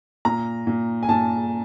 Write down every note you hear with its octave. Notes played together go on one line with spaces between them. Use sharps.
A#2 A#5
A#2
G#5
A#2 A5